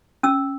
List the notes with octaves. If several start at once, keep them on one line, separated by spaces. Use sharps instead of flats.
C#4 E6